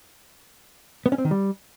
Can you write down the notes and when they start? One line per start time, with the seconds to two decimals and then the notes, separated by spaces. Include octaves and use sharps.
1.06 B3
1.12 C#4
1.18 C4
1.25 D#3
1.31 G3